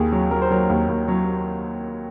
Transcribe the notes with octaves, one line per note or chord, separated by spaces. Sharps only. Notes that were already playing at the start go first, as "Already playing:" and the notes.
Already playing: D#2 G#4
F#3
F#3 A#4
C5
F#3 A#4
D#2
D#2
F#3